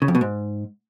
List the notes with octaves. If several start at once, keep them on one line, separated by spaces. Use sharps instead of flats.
C#3
F2
B2
G#2